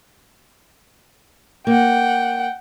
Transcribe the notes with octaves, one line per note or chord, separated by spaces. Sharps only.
A#3 F#5 G5